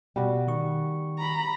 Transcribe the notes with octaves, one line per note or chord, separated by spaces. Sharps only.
B2 G3 F#4
D#3 C#6
A#5 B5